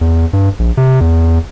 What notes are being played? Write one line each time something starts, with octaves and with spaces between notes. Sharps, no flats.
E2
G2
A#1
C3
E2